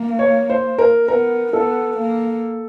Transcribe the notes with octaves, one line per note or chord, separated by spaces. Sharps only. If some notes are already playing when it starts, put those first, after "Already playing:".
Already playing: A#3
C#5
C5
A#4
B3 A#4
B3 A4
A#3